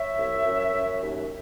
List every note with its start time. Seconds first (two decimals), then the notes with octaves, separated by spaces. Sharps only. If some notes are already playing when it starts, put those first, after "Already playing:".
Already playing: C#5 E5
0.18 C2
0.45 F#2
0.73 F#2
1.01 D#2